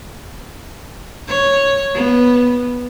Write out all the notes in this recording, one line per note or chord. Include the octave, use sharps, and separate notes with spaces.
C#5
B3